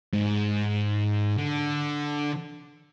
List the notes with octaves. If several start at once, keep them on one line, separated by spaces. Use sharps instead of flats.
G#2
D3